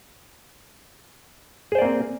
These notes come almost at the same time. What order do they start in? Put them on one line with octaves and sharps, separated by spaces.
G#4 C5 D5 A#3 C4